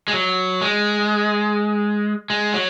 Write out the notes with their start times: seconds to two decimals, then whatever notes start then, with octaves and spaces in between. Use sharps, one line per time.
0.08 G#3
0.13 F#3
0.61 G#3
2.30 G#3
2.54 F#3